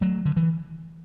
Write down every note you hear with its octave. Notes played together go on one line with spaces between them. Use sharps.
F#3 A3
D3
E3